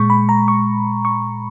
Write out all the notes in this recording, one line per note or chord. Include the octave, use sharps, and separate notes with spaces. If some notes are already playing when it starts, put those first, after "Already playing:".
Already playing: A#2 G#3 C#6
B5
A#5
C#6
C#6